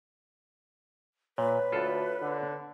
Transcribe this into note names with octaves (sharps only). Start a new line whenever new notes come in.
A#2 B4 C#5
D2 F4 A4
D3